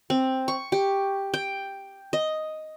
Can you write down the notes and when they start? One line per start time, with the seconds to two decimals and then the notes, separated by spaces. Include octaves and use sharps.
0.10 C4
0.48 C#6
0.72 G4
1.34 G5
2.13 D#5